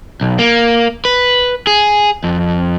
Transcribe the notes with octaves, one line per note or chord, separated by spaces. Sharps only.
B1
A#3
B4
G#4
F2